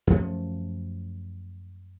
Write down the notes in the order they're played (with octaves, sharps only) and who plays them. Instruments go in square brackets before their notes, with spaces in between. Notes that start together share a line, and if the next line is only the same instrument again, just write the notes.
[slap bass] F#2 F3 A3 C#4